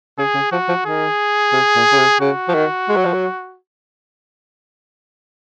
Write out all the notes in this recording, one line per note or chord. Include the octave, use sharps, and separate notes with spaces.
C#3 G#4
C#3
F3 F#4
F3
D#3 G#4
C3
A#2
C#3
C3
C#3 F#4
F3
D#3
G#3
F#3
F3
F#3